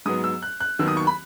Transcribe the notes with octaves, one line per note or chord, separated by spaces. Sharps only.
G#2 F#3 B3 D#6
E6
F#6
F#6
D#2 D#3 F#3 B3 E6
D#6
C#6
B5